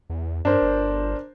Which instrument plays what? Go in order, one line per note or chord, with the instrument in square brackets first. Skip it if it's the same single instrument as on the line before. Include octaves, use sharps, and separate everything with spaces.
[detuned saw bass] E2
[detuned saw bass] G2 [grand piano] D4 A#4 C5
[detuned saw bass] G1